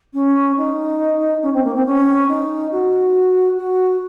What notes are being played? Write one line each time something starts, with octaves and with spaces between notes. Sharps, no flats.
C#4
D#4
C#4
C4
A#3
C4
C#4
D#4
F#4
F#4